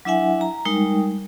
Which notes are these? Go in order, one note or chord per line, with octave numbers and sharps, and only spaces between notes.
F#3 D4 E4 E5 F#5 G#5
A#5
G3 G#3 D#4 A#4 G5